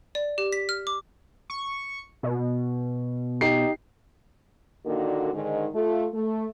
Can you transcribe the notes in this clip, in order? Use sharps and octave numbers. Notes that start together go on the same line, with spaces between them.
D5
G4
B6
F6
D6
C#6
B2
D#4 G4 C7
A#2 D3 D#3 A#3 D4 F#4
G#2 D3 D#3
A3 F4
A3